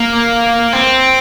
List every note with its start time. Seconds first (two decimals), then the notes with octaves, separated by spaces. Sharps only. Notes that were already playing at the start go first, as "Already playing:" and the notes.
Already playing: A#3
0.73 C4